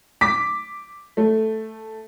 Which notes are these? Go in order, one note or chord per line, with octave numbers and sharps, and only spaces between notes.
D6 B6
A3